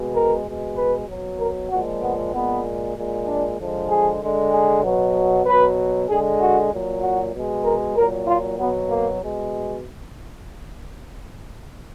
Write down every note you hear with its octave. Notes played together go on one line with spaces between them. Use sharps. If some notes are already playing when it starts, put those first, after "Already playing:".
Already playing: B2 G#3
A#4
B2 G#3
B4
B2 F#3
A#4
A#2 F3 G#3 F#4
B3
A#2 G#3 B3
A#2 G#3
D4
D3 F3 G#3
G#4
D3 G#3
G#4
B2 F#3
B2 F#3 B4
D3 G#3 G#4
F#4
A#2 F#3
F#4
B2 G#3
A#4
A#2 F#3 A#4
F4
B2 F#3 B3
A#3
B2 G#3